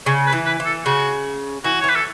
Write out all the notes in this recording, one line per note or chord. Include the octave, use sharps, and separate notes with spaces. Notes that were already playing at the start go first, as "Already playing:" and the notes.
C#3 C#5
B4
E3
B4
E3
A4
C#3 F#4
E3 F#4
C#5
E3
B4
A4